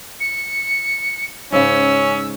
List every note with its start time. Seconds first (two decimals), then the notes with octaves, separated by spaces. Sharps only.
0.20 C#7
1.52 G#2 C#3 C#4 E6